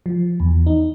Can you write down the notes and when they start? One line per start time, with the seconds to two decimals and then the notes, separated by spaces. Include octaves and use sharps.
0.06 F3
0.40 E2
0.67 D#4